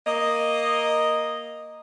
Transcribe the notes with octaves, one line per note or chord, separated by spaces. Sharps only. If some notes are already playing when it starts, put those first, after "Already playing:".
A#3 D#5